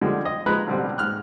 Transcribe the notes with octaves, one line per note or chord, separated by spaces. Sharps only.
D3 F3 G3 G#3
D#5
F3 G#3 B4 A#5 B5 F#6
A1 B2 D3 G3 C4
G#2 F6 F#6